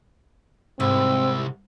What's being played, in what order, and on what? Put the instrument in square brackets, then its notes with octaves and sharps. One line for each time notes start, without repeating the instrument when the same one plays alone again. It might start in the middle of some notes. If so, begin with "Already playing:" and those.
[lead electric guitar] C2 [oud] G#2 [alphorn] C4 [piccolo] E6